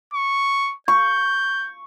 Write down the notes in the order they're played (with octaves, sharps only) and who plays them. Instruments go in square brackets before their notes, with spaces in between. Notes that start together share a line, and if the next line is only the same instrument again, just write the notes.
[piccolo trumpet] C#6
[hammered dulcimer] C#6 [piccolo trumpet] G6